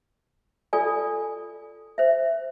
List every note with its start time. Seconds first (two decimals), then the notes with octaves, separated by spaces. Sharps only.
0.73 F4 A4 D5 G#5
1.98 C5 E5